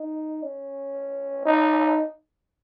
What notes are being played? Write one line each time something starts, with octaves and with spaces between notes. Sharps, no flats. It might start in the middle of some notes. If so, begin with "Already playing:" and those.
Already playing: D#4
C#4
D#4